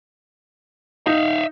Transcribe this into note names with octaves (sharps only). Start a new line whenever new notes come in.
D#4 E5 F5